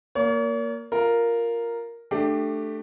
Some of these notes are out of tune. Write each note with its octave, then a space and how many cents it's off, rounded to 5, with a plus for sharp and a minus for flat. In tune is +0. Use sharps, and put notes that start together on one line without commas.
A#3 +0 C#5 +45
F4 +0 A#4 +0
A3 +0 D4 +20 G4 +0